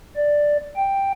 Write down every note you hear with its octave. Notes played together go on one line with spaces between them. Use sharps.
D5
G5